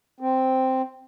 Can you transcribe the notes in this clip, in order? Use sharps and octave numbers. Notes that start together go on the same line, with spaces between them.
C4